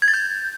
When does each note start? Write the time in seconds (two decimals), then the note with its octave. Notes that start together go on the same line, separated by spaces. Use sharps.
0.02 G#6
0.08 A6
0.14 G6